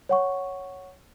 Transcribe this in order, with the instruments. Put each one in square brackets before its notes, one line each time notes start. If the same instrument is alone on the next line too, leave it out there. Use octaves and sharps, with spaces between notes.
[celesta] C#5 F#5 C#6